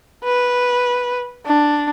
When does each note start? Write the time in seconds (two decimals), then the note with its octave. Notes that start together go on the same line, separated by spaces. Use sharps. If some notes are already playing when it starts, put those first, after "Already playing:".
0.24 B4
1.46 D4